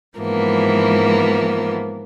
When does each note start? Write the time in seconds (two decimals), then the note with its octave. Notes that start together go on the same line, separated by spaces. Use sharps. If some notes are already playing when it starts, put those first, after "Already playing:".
0.17 G#2 E3 F3 A#3 B3